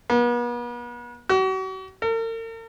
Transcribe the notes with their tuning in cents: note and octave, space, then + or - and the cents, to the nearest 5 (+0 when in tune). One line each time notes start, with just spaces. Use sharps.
B3 -40
F#4 +40
A#4 -45